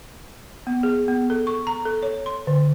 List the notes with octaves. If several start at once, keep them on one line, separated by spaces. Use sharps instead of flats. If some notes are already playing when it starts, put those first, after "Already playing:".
B3
G#4
B3
A4
C#6
A#5
A4
C#5
C6
D3